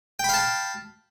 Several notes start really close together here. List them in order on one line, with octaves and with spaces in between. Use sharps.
G5 B5 F5 A5